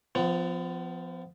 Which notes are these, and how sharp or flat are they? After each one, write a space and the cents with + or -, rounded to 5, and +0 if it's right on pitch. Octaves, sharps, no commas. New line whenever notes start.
F3 +0 B3 +35